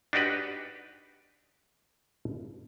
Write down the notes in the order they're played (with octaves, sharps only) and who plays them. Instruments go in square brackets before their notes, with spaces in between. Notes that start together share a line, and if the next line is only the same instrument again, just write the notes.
[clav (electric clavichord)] D4 D#4 F#4 G4 B4